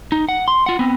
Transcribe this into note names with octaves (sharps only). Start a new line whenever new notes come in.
D#4
F#5
C6
F4 F#5
B3 C4